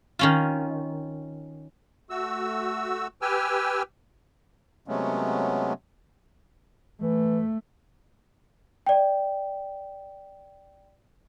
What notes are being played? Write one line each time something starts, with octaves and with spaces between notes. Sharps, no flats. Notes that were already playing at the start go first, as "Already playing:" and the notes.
D#3 C#4 F4
A3 F#4 E6
G4 B4 G5 G#5 E6 F6
C3 F#3 G#3 A3 B3 C#4
E3 A3
D5 G5